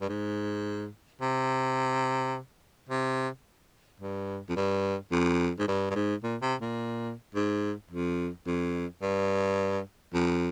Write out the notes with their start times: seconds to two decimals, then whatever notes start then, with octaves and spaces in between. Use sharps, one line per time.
0.01 G2
0.09 G#2
1.21 C3
2.89 C3
4.00 G2
4.49 F2
4.56 G2
5.11 F2
5.59 G#2
5.68 G2
5.90 G2
5.95 G#2
6.23 A#2
6.42 C3
6.60 A#2
7.34 G#2
7.90 F2
8.46 F2
9.02 G2
10.14 F2